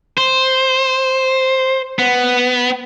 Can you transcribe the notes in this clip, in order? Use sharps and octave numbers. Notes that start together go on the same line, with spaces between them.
C5
B3